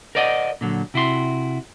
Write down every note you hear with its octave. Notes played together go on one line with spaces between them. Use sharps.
A#4 C5 D5 D#5 F5 F#5
A#2 D3 F#3
C3 E4 F#4 C6